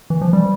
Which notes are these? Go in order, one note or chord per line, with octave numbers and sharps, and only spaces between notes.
E3
F3
G3